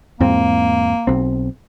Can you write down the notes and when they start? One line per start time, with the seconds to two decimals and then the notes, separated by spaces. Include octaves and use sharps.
0.20 E2 G#2 A#3 C4
1.07 B1 C4